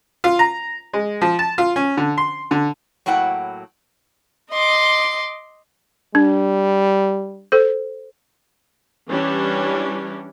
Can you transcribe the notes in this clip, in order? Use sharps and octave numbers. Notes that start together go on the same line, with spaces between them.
F4
A#5
G#3
F3
A5
F4
C#4
D3
C6
D3
A2 F#3 A#3 E4 F#5 G5
D#5 C6 D6
G3 D4
A4 C5
E3 G3 C#4 D4